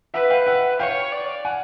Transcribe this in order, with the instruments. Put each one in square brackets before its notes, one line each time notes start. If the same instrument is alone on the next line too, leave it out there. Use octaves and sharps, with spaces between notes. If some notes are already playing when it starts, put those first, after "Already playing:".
[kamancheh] B4 [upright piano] E5 F#5
[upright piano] F5 G5
E5 F#5
[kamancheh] C#5 [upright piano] F5 G5
[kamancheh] D5
[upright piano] F#5 G#5